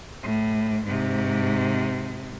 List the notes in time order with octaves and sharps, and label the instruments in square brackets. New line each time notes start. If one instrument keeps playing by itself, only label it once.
[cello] A2
G#2 C3